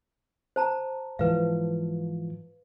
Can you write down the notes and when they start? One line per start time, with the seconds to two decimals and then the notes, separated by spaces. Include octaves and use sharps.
0.56 C5 A5 A#5
1.19 G#2 E3 F3 B4 F5